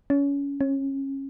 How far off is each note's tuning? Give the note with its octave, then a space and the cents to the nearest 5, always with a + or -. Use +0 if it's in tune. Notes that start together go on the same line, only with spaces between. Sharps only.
C#4 +25
C#4 -25